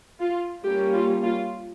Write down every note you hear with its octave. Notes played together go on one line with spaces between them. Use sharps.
F4
G3 A#3 C#4 G4
F4
F4